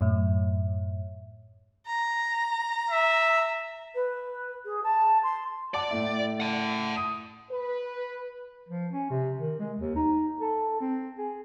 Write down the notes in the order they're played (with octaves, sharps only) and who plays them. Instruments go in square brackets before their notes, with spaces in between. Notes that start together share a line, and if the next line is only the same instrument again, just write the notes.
[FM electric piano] F#2 A2
[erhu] A#5
[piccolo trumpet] E5
[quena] B4
G#4
A5
C6
[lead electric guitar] D5 [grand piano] F#5 A5 D6
[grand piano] A2 A3 E4
[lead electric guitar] F#5 A5
[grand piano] D#6
[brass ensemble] B4
[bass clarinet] F3
C#4
C3
D#3
G#3
D#2
D#4
A4
C4
G#4